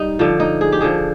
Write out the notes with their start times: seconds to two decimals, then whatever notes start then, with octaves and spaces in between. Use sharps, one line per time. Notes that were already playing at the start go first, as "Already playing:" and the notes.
Already playing: G3 D#4
0.19 D3 F3
0.40 D#4
0.61 G#4
0.72 G4
0.81 D3 F3 G#4